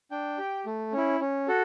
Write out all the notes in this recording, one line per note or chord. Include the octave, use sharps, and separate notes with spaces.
D4 G5
G4
A3
C#4 E4
C#4
F#4 A4